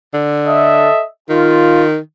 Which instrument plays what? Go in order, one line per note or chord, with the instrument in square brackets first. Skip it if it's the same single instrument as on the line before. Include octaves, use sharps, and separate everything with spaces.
[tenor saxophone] D3
[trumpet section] A4 D#5 E5
[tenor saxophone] D#3 [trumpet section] F4